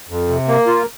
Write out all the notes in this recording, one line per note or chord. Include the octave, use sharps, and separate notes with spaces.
F2
C3
A#3
F4